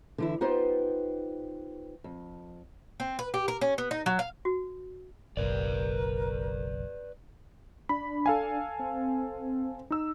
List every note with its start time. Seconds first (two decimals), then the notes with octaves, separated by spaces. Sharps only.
0.18 D3 E3 E4
0.41 B3 D#4 F4 G4 B4 C5
2.04 F2
3.00 C4
3.19 B4
3.34 G4
3.48 A#4
3.61 C#4
3.78 B3
3.91 D#4
4.06 F#3
4.19 F5
4.45 F#4
5.37 F#1 B1 A#4 B4 D5
7.89 D4 B5
8.26 A4 F5 G#5
8.79 C4
9.90 D#4 E6